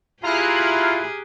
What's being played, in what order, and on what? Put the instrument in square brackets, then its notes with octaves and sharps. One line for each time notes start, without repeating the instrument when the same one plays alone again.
[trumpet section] E4 [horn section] F4 [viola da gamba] G4 G#4 [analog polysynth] A#5 F6 F#6